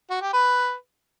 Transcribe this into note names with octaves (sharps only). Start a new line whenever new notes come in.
F#4
G4
B4